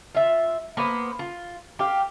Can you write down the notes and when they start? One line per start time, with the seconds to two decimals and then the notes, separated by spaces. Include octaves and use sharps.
0.15 F4 E5
0.77 A#3 B3 B4 C5
1.19 F4
1.79 G4 F5